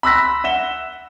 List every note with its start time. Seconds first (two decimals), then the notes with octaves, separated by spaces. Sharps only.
0.03 B5 C6 E6 F#6 A#6 B6
0.44 E5 F#5 E7 G7